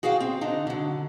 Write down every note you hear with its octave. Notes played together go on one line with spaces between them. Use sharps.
F#4 G#4 D5 F5 G5
C4
D3 D4 D#4
D3 F#3